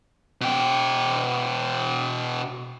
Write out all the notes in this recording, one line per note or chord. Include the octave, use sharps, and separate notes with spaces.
B2 G5